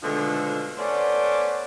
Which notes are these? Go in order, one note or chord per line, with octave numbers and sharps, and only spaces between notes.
B2 D3 D#3 F3 G#3 A3
A3 B3 C#4 C5 D5